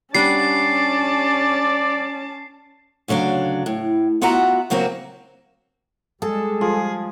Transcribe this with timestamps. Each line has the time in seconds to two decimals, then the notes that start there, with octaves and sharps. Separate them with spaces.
0.15 G3 C#4 D4 D5 F#5 A5 C7
3.08 D2 C#3 F#3 D4 F5
3.66 A2
4.22 B3 F4 F#4 E5 F#5 A#5
4.70 C#3 F#3 A#3 C4 F#4
6.22 G3 G#3 G#4 A4 A5
6.61 F3 G#4